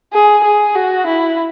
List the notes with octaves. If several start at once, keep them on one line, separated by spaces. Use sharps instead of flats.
G#4
G#4
F#4
E4